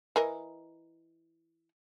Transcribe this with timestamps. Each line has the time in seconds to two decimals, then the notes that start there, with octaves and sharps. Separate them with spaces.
0.16 E3 A#4 D#5